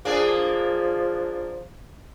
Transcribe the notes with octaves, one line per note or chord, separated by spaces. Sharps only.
F3 A#3 D4 G#4